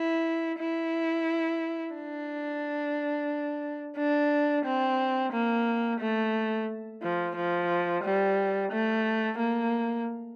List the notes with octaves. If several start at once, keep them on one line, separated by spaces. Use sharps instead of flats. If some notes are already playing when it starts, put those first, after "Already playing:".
Already playing: E4
E4
D4
D4
C4
A#3
A3
F3
F3
G3
A3
A#3